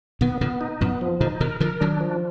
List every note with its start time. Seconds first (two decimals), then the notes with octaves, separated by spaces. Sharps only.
0.21 B2 D#3 B3
0.41 A#2 D3 B3
0.61 D#4
0.81 F#2 A#2 B3
1.01 F3
1.21 A#2 D3 D#4
1.40 B2 D#3 A#4
1.60 D3 F3 A#4
1.80 D#3 F#3 D4
2.01 F3